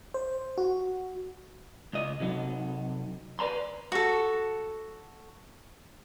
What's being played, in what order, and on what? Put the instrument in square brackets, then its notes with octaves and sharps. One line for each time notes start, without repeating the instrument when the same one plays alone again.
[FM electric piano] C5
F#4
[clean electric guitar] C#2 D#5
C3 F#3 D#4
B4 D5 A#5 C6
[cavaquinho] F#4 A4